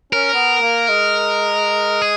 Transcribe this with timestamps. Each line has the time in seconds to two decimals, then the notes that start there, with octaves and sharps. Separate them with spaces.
0.13 C#4 A#4
0.34 B3
0.62 A#3
0.89 G#3
2.02 G#4